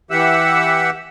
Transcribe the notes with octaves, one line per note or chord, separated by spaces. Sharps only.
E3 G4 E5 F#5 E6